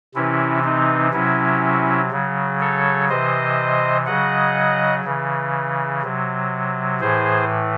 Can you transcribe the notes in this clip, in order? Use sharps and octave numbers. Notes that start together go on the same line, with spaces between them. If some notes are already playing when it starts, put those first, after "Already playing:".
C3 E3 C#4 E4
C4 D#4
C3 F#3 C#4 E4
C#3 F#3
A4 C#5
C3 E3 C5 D#5
C#3 F#3 D#5 F#5
C#3 E3
C3 F#3
A2 E3 G#4 C5